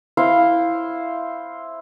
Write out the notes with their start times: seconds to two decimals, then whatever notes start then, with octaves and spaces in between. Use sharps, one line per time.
0.17 E4 C5 F5